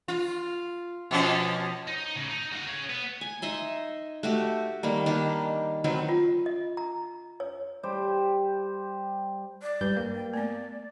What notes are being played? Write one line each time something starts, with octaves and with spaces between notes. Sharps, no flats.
F4
B2 F3 C#4
D#4
A2 C#3
D#4
F#4 F5
C#4 G#4
B3
G#5
D#4 D#5 E5 C6
A3 F#4 G4
D#3 G3 A#3
D#3 A#3 D4 G4
D#3 F#3 C4 B4
F4
D#5
A#5
C#5
G3 G4 C5
D5
G2 G3 B4 G6
A#3
G5
A3 B3 D5